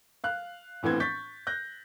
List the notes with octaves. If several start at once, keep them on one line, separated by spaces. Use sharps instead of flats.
F5 F#6
A#1 A2 E3 B3 C4 G#6
C#6 G6 A6 B6
F#6 G6 A#6